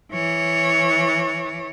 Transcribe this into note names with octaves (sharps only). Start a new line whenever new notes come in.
E3 C#5